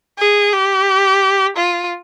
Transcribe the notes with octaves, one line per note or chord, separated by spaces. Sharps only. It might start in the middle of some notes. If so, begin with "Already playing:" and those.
G#4
G4
F4